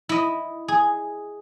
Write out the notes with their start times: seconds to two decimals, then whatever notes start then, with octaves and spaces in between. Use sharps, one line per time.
0.09 E4 D#5
0.68 G#4